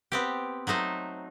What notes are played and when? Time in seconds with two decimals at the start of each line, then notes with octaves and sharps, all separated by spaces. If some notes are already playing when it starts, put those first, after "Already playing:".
0.12 B3 C4 G4
0.67 F#3 A3 D#4 C5